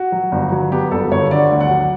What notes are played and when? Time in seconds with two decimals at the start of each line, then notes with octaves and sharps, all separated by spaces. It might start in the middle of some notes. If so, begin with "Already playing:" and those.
Already playing: F#4
0.12 F#3
0.32 G1
0.52 F#3
0.72 B3 G4
0.91 G1 A4
1.11 G1 C#5
1.31 D3 D5
1.51 D2
1.61 F#5
1.71 F#3